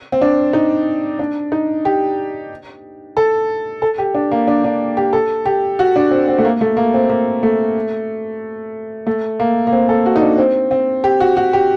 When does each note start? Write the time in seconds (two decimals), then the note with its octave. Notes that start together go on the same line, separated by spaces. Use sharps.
0.12 C4
0.21 D4
0.53 D#4
1.19 D4
1.52 D#4
1.85 G4
3.17 A4
3.82 A4
3.98 G4
4.14 D4
4.31 A#3
4.47 D4
4.64 D4
4.97 G4
5.13 A4
5.46 G4
5.79 F#4
5.96 D4
6.11 C4
6.28 C4
6.38 A3
6.45 A#3
6.61 A3
6.77 A#3
6.94 C4
7.10 A#3
7.43 A3
9.07 A3
9.40 A#3
9.67 A#3
9.72 C4
9.89 A4
10.06 F#4
10.16 D#4
10.22 D4
10.38 C4
10.71 C4
11.04 G4
11.20 F#4
11.37 F#4
11.53 G4